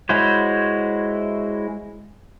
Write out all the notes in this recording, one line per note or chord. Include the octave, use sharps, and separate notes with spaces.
G#3 E4 F#4 C5 C#5